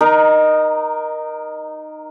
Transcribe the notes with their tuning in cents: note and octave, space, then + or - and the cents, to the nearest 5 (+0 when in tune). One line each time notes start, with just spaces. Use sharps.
D#4 -15 A#4 +15